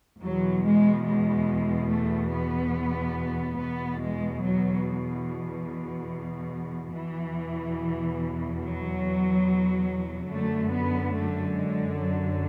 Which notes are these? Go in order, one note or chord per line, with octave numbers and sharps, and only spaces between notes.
E2 B2 F#3
G#3
G#3
A3
B3
E2 B2 B3
G#3
F#3
E2 B2 E3
F#3
F#2 D3 A3
B3
A3
G#3
F#3